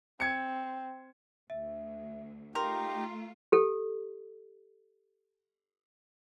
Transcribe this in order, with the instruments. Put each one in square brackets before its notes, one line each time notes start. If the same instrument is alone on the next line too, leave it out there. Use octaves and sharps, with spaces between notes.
[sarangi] C4 [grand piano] G#6 C#7
[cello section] D2 [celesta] E5
[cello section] A3 F4 [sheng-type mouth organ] D#4 G4 [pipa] A#4 [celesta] C6
[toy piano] G4 A4